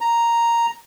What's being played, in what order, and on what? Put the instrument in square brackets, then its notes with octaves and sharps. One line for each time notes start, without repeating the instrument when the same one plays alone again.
[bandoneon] A#5